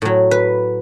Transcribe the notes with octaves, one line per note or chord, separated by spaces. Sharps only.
A2 F#3
B4